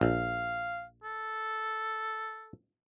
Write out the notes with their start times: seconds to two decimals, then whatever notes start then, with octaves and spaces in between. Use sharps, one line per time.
0.01 A#1 F5
1.04 A4